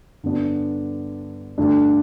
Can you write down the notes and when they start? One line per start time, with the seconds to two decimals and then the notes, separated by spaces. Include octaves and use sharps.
0.23 G2 D3 B3 D4
1.58 G2 D3 A3 D4